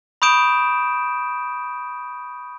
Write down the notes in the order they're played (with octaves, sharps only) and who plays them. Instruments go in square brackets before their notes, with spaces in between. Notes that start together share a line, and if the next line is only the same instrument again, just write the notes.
[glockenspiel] B5 C#6 D#6 G6 D7 E7